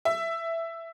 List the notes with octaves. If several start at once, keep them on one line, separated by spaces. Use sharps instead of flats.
E5